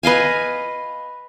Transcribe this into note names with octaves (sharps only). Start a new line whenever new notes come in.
B4 D#5 F5 G#5